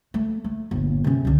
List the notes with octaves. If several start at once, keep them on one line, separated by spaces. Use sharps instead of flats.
A3
A3
G1 A#2
C3 C#4
C#2 D3